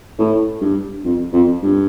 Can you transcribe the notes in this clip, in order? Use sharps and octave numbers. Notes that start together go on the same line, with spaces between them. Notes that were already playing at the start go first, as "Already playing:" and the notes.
A2
G2
F2
F2
G2